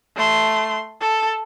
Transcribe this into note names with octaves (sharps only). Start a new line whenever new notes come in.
A3 C6
A4